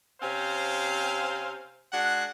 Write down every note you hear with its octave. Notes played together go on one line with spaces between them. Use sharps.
C3 C4 C#4 C5 F5
G#3 D4 F#4 F#5